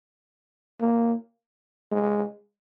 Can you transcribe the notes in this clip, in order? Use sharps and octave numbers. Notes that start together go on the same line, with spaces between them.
A#3
G#3